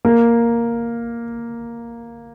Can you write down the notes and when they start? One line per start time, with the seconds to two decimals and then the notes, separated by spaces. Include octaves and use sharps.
0.05 A#3